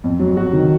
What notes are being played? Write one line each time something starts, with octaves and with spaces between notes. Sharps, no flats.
F2
F#3
F2 F#4
D#3